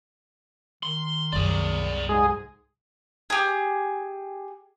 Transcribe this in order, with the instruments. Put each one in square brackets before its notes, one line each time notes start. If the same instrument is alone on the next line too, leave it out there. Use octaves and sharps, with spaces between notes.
[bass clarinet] D#3 [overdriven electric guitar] C6
[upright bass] C2 F#2 [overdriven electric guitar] G#4 D5
[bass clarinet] G#2 [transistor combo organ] G#3 G#4
[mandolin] G4 G#4